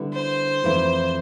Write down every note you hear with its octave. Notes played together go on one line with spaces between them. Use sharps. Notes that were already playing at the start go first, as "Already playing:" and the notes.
Already playing: D3 G3 B3 E4
C5
F2 E3 A3 E4